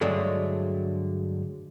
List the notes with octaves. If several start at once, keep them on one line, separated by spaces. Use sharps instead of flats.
G2 D3 F#3 G#3 A3